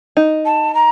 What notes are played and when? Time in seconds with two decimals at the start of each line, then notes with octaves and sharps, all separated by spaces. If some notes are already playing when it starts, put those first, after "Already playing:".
0.17 D#4
0.45 A5
0.74 A#5